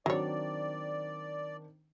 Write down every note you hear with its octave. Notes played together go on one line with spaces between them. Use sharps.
D#3 F#3 C4 D4 C#5 D5